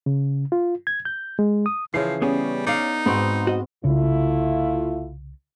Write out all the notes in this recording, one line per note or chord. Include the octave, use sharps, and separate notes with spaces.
C#3
F4
G#6
G6
G#3
D#6
C#3 E3 F3 C7
G3 B3 C#4 G#4
D#4 D5 F5
G#2 B3 C4 F#4
F#4 D#5
C2 C#3 A3 D4 E4 F4